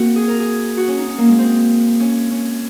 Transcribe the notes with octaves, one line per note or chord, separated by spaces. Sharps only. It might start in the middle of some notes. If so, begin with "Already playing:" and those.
Already playing: A#3 C4 F#4
G#4
A#4
G#4
F#4
C#4
D#4
C#4
A#3
G#3
C4
C#4
C#4